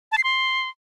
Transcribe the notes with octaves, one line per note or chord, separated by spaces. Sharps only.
A5
C7
C6